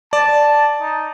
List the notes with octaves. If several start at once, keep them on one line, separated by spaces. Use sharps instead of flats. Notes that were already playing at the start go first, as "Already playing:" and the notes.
D5 A5
D#4